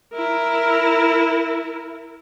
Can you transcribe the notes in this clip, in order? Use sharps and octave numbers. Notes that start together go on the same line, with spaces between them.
E4 A#4